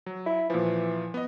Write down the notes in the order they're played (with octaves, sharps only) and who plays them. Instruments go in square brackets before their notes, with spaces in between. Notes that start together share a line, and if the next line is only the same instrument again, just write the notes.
[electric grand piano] F#3
[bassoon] E4
[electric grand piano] A#2 F3 [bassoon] E3
[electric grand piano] B3 D#5